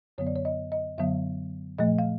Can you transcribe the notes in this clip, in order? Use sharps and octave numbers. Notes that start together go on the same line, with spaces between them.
F#2 D3 F#3 B3 C#5
D5
C#5
D#5
D#5
F#2 D3 F#3 B3 E5
A#2 F3 A3 D#5
F5